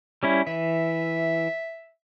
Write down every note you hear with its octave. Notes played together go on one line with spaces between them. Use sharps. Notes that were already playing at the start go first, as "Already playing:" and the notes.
G3 C#4 E4
E3 E5